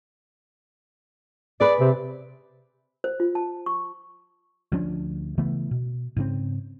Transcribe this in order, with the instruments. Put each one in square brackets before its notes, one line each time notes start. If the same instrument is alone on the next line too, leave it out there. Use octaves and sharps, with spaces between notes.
[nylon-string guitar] G#4 B4 [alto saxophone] D5
[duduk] C3 [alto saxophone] C4
[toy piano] C5
F4
A5
C#6
[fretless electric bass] D2 F3 C#4 D4
C#3 E3 A3 B3
B2
G#2 C#3 C4